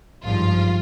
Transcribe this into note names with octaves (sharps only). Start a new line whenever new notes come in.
G#1 G2 F3 F4